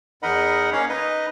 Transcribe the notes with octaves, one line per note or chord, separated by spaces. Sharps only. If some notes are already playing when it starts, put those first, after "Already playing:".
E2 D#4 A#4 D#5 F#5 B5
A#3 C#4 C#5 F5
D#4 B4 D#5